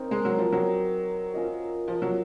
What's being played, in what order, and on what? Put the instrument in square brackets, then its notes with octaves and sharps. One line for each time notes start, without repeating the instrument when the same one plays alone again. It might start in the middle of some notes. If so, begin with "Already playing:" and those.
Already playing: [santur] C4 D#4 A#4 C#5
[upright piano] G#3
F#3
F3
[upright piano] F#3 [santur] C4 D#4 F#4 C5
[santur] C#4 F4 A#4 D#5
[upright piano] F3
F#3